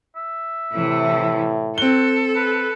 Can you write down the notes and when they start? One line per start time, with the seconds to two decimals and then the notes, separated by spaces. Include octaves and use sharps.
0.16 E5
0.73 A2 C3 E3
1.78 C4 F#4 A4 G7
2.36 B4